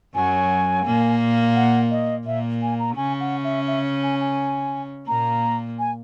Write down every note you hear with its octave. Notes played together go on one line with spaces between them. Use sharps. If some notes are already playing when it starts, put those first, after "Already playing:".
F#2 F#3 G#5
A#2 A#3
F#5
D#5
A#2 A#3 E5
G#5
A#5
C#3 C#4 G#5
F#5
E5
E5
G#5
G#5
A#2 A#3 A#5
G#5